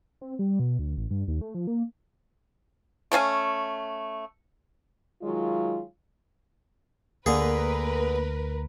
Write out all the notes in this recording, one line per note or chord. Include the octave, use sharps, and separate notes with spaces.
C4
G3
B2
D2
A1
G2
D#2
A3
F3
A#3
A3 C#4 F5 G#5
D#3 F#3 G#3 F4
D2 D3 A#3 G#4 A#4 B4